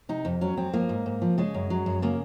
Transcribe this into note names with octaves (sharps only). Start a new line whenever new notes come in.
C3 D#4
F2
F#3 C#4
F2 C4
F3 A#3
G#2
G#2
F3
C#3 G#3
F#2
F#3
F#2
C#3 A#3